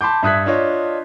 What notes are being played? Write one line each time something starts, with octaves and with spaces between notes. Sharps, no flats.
A5 B5 C6 D6 G6
G2 E5 D#6 F#6 G#6 B6
D4 F4 C#5 D#5